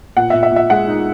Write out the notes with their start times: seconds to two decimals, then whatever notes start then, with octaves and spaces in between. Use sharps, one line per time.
0.17 A#2 F#5
0.30 A#2 E5
0.43 E5
0.51 A#2
0.56 E5
0.70 G#3 F#5
0.87 D#4